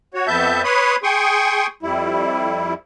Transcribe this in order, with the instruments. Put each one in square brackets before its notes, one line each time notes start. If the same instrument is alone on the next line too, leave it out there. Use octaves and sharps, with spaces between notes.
[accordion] F#4 C#5
F2 B3 E5 A5 G6
B4 C#5 B5 C6 D#6
G#4 G5 C6 C#6 D#6
F2 G3 E4